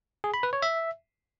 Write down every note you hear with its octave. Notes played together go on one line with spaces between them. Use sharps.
G#4
B5
B4
C#5
E5